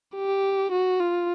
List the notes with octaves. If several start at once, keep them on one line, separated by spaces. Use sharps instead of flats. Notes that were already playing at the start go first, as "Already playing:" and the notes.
G4
F#4
F4